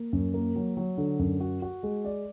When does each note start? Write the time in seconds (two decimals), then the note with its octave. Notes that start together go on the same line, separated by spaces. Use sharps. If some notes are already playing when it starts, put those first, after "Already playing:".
Already playing: A#3
0.13 F#2
0.34 A#3
0.55 F#3
0.77 F#3
0.98 D3
1.19 F#2
1.40 F#4
1.62 F#4
1.83 G#3
2.05 D5